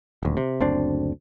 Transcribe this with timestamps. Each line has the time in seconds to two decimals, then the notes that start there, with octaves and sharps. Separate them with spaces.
0.23 D#1 D2
0.37 C3
0.60 F#1 D2 C4 D4